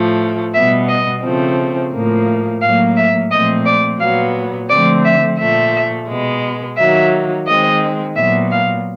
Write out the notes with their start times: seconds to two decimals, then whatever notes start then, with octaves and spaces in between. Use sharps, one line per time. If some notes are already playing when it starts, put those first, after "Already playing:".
Already playing: A2 F3 A3
0.54 B2 G3 B3 E5
0.89 D#5
1.23 C#3 F3 A3 C4
1.93 A2 F3 A#3
2.61 A2 F#3 A#3 F5
2.97 E5
3.31 A#2 F3 A3 C4 D#5
3.66 D5
4.00 A#2 F#3 B3 F5
4.69 D3 F3 A3 C4 D5
5.05 E5
5.39 A#2 F3 A3 E5
6.09 B2 G#3 B3
6.77 D#3 F#3 A#3 E5
7.47 D#3 G#3 C4 D#5
8.16 A#2 F#3 B3 E5
8.52 F5